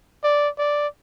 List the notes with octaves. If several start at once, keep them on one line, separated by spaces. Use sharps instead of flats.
D5
D5